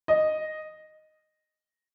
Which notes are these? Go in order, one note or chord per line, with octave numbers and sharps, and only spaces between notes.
D#5